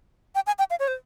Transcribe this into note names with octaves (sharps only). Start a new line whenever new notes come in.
G5
G#5
G5
F5
C#5
C5